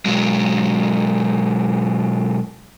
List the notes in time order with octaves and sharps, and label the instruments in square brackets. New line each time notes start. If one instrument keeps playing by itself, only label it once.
[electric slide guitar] B2 F#3 G#3